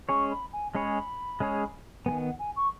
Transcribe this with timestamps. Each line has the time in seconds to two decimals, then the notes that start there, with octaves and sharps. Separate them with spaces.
0.08 G#3 C#4 G#4 C#5 C#6
0.31 B5
0.53 G#5
0.75 G#3 C#4 G#4 C#5 B5
1.40 G#3 C#4 G#4 C#5
2.06 D#3 G#3 B3 G#5
2.23 F#5
2.39 G#5
2.56 C#6